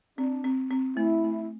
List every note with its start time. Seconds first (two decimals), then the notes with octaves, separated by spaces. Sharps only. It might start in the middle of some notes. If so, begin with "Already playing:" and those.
0.18 C4 D4
0.44 C4
0.71 C4
0.97 A3 E4
1.24 A3